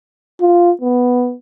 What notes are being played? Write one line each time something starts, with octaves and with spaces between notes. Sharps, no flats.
F4
B3